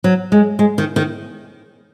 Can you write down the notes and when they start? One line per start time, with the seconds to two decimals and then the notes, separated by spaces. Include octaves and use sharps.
0.04 F#3
0.32 G#3
0.59 G#3
0.78 D#3
0.96 D#3